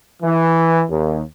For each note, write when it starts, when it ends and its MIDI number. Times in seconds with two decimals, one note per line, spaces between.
0.23 0.83 52
0.90 1.22 39